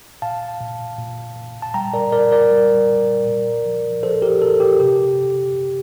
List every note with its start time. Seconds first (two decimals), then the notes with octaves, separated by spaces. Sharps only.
0.22 A#2 F5 A5
0.60 A#2
0.99 A#2
1.36 A#2
1.62 A5
1.74 G3 G5 A#5
1.94 A#4 D5
2.12 A#2 A#4 D5
2.32 A#4 D5
2.51 G3
2.89 A#2
3.27 A#2
3.66 F3
4.03 F3 A4 C5
4.22 G4 A#4
4.42 A#2 A4
4.60 G4
4.80 C3 G4